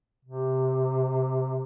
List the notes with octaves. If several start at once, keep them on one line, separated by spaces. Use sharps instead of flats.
C3